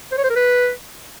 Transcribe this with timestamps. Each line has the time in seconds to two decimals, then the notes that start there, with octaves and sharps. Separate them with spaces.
0.12 C5
0.18 C#5
0.24 C5
0.30 A#4
0.36 B4